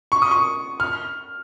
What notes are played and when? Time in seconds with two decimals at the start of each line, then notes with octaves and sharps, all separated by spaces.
0.12 C#6
0.22 D#6
0.31 C#6
0.80 F6